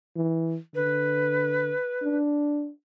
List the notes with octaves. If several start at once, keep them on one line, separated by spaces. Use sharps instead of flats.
E3
D3 B4
D4